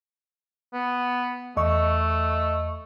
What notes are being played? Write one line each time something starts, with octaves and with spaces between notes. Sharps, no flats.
B3
E2 A3 D#5 C#6